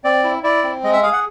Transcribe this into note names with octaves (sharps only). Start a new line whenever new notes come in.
C4 D5
E4
E4 D5
C4
G#3 D#5
E5
G#4 F5
F#5